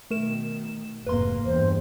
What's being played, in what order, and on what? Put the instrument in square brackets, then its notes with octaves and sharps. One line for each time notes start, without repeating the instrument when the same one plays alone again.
[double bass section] B2 D#3 [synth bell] A3 A#4 E7
[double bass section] F1 G#2 A#3 [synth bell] B4 C6
[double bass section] E2 G2 [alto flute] C5